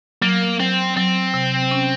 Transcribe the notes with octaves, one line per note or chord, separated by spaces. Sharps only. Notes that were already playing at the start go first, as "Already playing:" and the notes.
F#3 A#3
F#3 C4
F#3 C4
C3
C#4